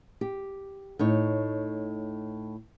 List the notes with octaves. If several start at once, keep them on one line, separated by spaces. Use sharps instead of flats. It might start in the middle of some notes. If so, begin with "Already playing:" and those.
G4
A2 D#4 C#5